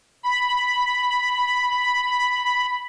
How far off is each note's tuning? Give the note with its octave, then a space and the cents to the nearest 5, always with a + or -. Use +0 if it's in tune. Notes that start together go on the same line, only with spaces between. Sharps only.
B5 +0